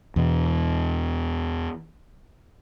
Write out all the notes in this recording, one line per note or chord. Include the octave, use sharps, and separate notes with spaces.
E2 B2